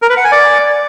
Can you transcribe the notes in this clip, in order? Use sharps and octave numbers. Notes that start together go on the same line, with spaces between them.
A#4
B4
F#5
G#5
D5